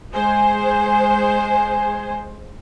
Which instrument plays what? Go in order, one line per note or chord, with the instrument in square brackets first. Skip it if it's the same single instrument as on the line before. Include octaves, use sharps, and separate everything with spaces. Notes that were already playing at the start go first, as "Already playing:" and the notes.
[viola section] G#3 C5 [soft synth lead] G#5